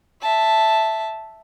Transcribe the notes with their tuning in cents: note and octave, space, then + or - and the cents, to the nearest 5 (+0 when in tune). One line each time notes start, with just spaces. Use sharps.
E5 +0 A5 +0